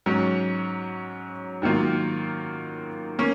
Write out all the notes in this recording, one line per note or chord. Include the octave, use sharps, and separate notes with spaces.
G#2 F#3 C#4
G#2 D#3 F#3 A#3 F4
A#3 C#4